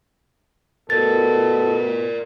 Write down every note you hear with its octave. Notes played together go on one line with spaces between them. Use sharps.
B2 A4 A#4 D5 A6